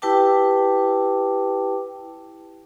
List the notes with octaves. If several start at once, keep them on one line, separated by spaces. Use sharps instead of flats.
E4 G4 B4 G5 A5 D6